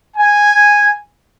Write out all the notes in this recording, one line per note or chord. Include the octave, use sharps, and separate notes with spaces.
G#5